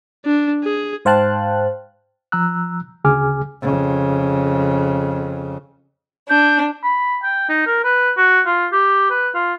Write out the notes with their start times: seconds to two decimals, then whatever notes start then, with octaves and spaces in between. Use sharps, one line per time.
0.25 D4
0.64 G#4
1.05 G#2 C5 F5 G5 A5 F#6
2.32 F3 A#5 E6 F#6
3.04 D2 C#3 G#4 G#5 D6 F6
3.62 F2 C#3
6.29 D4 G6
6.83 B5
7.23 G5
7.49 D#4
7.67 A#4
7.84 B4
8.17 F#4
8.46 F4
8.72 G4
9.10 B4
9.35 F4